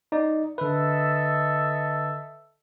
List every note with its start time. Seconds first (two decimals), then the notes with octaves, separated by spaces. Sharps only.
0.12 D#4 D5
0.58 D3 A4 B4 D#5 E5